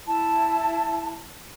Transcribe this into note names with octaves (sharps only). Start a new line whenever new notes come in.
E4 A5